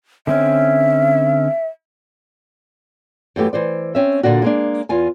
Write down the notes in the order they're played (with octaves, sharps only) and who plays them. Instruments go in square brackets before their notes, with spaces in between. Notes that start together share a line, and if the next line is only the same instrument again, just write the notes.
[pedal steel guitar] D3 C4 C#4 [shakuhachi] E5
[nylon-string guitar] F#2 E3 A3 G4
E3 C5 D5
C4 C#4 E5
A#2 D3 D4 F#4
G#3 A#3 D4
E2 F4 G#5